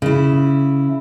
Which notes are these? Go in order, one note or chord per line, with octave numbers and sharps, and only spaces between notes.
C#3 E4